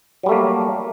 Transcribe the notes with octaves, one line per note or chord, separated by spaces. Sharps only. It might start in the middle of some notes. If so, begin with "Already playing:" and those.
F#3 G3 A3 A#3